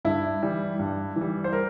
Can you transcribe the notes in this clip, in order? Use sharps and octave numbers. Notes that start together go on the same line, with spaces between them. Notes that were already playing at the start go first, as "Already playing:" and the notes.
G2 E4
E3 G3
G2
E3
G3
C5
A#4